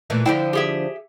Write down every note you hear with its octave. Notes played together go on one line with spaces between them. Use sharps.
A#2 E3 A3
D3 F3 D4 E4 G5
G4 G#4 E5